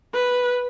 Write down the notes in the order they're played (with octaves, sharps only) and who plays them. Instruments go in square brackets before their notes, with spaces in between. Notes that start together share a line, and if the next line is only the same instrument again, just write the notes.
[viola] B4